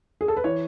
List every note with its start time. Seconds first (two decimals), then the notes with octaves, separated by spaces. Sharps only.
0.21 G#4
0.28 A4
0.37 B4
0.44 E3 C#5